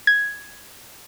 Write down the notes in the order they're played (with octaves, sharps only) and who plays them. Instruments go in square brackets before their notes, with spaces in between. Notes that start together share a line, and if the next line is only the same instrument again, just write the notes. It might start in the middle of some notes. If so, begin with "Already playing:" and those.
[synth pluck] G#6